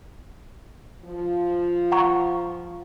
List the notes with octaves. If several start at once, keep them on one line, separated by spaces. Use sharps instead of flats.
F3
F#5 A#5 C#6